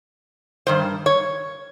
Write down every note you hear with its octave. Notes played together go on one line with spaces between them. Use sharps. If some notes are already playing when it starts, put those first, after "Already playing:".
G2 D#3 C5
C#5